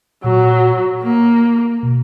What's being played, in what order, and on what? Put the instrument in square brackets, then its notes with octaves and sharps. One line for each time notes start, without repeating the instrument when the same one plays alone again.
[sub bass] A#2 [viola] F#3
[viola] A#3
[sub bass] B2